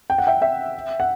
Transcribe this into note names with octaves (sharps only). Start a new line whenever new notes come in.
G5
F#5
E5 G5
E5 G5
F#5